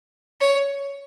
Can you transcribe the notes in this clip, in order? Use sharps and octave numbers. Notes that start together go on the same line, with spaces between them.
C#5